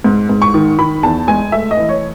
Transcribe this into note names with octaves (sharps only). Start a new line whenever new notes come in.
G#2
G#2
C#6
D#3
D#3 B5
E2 A5
G#3 G#5
A3 E5
D#5
E3
C#5